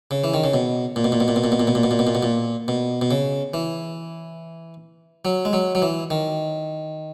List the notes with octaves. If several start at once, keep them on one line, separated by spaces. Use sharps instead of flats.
C#3
E3
D#3
C#3
B2
A#2
B2
A#2
B2
A#2
B2
A#2
B2
A#2
B2
A#2
B2
A#2
B2
A#2
B2
A#2
B2
B2
C#3
E3
F#3
G#3
F#3
F#3
E3
D#3